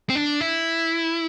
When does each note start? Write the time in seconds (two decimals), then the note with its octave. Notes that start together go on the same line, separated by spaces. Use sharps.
0.10 C4
0.15 D4
0.40 E4